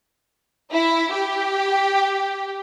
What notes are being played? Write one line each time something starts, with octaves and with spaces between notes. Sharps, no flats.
E4
G4